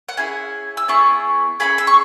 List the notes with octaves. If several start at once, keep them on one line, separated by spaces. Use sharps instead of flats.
F#5
C#4 E4 G#4 G#5
E6
B3 E4 G#4 C#6
C#4 E4 G#4 B5
E6
C#6